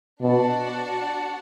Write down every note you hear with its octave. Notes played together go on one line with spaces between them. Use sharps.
B2 D4 F#4 D5 F#5 A5